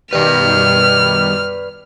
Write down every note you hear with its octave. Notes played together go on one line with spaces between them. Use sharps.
B2 D#3 G3 B4 D5 F6